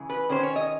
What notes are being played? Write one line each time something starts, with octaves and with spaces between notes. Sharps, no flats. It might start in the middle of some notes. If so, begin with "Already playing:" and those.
Already playing: C#3 E3 G#3
B4
D#3 G#3 C#4 C5
C#5
D#5